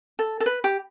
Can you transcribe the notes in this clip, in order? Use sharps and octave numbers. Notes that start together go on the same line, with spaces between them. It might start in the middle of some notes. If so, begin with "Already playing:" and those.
A4
A4
B4
G4